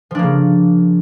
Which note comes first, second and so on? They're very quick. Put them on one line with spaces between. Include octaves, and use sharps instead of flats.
F3 D4 A#3 C#3